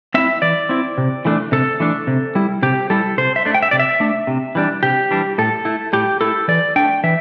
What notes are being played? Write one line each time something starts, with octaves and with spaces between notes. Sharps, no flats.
C4 E4 E5
E3 D5
C4 E4
C3
E3 A3 D4
C3 A4
E3 A3 D4
C3
G3 E4
C3 G4
G3 E4 A4
C3 C5
E5
A3 D4
G5
E5
C3 D5
E5
A3 D4
C3
E3 G3 D4
C3 G4
E3 G3 D4
A2 A4
A3 E4
A2 G4
A3 E4 A4
E3 D5
A3 D4 G5
E3 E5